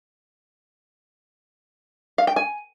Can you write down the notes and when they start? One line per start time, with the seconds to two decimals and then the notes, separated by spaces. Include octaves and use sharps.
2.18 F5
2.27 G5
2.36 G#5